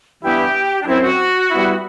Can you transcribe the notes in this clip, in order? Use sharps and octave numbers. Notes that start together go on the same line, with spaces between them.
G2 E3 G3 B3 E4 G4
D4
F#2 F#3 C4 E4
F#4
G3 B3 E4